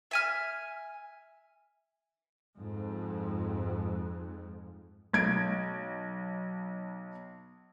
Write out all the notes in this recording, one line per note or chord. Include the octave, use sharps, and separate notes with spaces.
E5 G#5 F6
F2 G#2
B1 G#6 D7